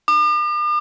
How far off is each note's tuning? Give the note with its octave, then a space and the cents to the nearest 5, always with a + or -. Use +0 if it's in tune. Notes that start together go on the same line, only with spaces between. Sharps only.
D6 +45